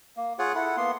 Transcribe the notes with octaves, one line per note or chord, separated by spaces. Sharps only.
A#3
F4 G#4 C#5 F#5
E4 A4 F#5
A#3 B3 C6